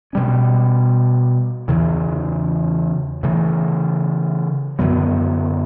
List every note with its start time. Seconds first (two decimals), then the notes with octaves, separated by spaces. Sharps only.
0.13 B2 G3 C#4
1.68 E2 C#3 E3
3.23 C#3 E3 A3
4.79 F#2 D3 F#3 B3